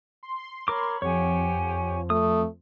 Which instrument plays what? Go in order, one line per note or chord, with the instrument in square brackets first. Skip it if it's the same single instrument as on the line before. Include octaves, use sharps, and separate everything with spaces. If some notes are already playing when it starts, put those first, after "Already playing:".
[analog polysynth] C6
[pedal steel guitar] A#4 D6 [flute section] C#5 B5 C#6
[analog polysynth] F2 F3 [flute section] G4 F#5 G#5 [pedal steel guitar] C#5
[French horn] A3 [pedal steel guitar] D#6